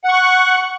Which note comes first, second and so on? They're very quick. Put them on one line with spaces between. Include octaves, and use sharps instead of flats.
F#5 C#6 F#6